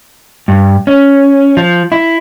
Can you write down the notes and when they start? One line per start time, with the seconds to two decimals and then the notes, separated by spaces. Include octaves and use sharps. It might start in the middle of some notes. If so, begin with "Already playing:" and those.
0.48 G2
0.87 C#4
1.57 F3
1.92 E4